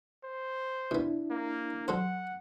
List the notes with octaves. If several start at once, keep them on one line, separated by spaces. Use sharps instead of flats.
C5
B2 B3 D4 E4
A#3
F#3 A4 C5 F#5